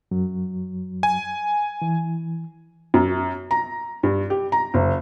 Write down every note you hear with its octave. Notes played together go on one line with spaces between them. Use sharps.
F#2 F#3
G#5
E3
F#2
A#5
G2
G4
A#5
F#1